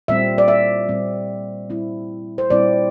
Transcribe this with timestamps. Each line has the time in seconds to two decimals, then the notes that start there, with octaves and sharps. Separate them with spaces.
0.08 A#2 G3 C4 E5
0.38 D5
0.48 E5
0.89 A#2 G3 C4
1.70 A#2 G3 C4 E4
2.38 C5
2.50 A#2 G3 C4 E4 D5